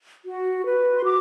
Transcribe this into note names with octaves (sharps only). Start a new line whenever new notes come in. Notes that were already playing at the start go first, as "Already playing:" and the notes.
F#4
B4
C6
F#4 D6